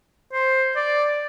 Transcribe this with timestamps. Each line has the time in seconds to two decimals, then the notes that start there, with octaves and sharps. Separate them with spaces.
0.33 C5
0.76 D5